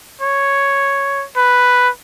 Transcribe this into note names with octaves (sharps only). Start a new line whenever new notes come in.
C#5
B4